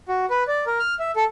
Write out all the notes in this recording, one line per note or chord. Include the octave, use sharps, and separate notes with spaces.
F#4
B4
D5
A#4
F6
E5
A4